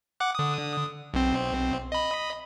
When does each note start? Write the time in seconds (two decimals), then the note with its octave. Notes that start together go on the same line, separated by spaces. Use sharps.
0.20 F#5 D6 F#6
0.35 D3 D#6
1.14 B1 C4
1.92 D#5 B5